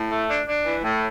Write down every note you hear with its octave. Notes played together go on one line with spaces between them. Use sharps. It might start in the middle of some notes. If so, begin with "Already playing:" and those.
Already playing: A2
A3
D4
D4
E3
A2